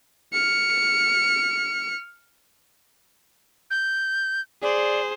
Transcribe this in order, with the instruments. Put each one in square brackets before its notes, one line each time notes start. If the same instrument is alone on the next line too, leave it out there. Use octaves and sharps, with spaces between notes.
[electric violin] F6 C#7
[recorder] G6
[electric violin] G#4 C5 [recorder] D5